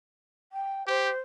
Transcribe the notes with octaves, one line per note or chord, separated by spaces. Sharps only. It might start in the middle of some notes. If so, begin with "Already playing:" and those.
G5
G4 C5